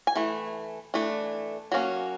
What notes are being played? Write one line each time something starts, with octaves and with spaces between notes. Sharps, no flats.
G#5
E3 A3
E3 A3 D4
F#3 A#3 C#4